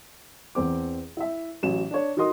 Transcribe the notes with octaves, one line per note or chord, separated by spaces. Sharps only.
E2 C4 D6
E4 E5
A1 F#3 E7
D4 C#5
D#4 F#4 A#4 D#5 C6 D#6